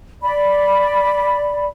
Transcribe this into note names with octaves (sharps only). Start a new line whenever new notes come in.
D5 B5